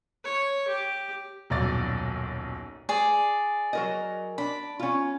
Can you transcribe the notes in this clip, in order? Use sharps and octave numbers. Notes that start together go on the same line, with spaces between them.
C#5
G4
D#1 B1 F#2 D5 A6
G#4 D5
F#3 A#4 D#5
D4 B5
C#4 F4